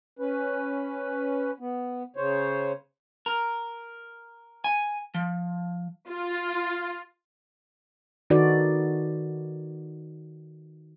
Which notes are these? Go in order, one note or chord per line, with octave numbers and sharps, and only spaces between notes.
C#4 B4
B3
C#3 C5 C#5
A#4
G#5
F3
F4
D#3 D#4 F#4 A4 B4 D5